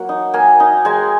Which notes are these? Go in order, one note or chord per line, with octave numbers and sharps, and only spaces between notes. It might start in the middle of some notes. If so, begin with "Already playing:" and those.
Already playing: F#3 A#3 F#5
D#4
A#3 G#5
D#4
G#3 G#5